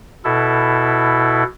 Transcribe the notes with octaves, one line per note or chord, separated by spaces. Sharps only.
B2 E4 A4